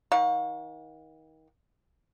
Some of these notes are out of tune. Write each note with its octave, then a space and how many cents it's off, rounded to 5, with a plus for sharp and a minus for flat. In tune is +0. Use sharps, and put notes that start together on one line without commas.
D#3 +30 F5 +45